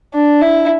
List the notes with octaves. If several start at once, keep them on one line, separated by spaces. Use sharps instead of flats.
D4
E4